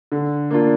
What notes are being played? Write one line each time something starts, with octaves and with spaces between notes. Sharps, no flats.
D3
A#3 D4 F4